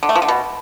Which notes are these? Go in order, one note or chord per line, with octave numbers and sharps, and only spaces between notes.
D3
A3
F3
D3
B2